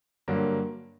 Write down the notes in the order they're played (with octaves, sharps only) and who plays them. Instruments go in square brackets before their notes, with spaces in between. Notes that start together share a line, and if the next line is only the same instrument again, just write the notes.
[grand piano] G2 D3 F#3 A#3